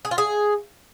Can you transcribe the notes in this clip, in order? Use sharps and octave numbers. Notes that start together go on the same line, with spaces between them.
G#4
F4
G#4